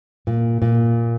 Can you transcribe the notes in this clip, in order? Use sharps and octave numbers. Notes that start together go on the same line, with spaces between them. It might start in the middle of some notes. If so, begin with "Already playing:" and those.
A#2
A#2